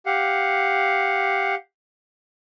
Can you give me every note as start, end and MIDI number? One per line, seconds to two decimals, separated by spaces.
0.06 1.55 67
0.06 1.55 77
0.06 1.55 78